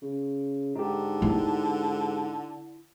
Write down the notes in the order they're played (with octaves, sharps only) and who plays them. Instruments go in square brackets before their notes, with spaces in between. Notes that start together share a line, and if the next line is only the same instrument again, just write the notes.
[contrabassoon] C#3
[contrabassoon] G#2 [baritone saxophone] D3 [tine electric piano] D#4 G4
[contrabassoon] G#2 [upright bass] E4